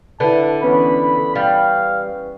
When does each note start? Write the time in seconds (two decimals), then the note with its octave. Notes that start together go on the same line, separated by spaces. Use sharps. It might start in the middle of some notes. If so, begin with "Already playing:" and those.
0.20 D3 E4 B4 A5
0.62 E3 B3 C#4 B5
1.35 G3 F5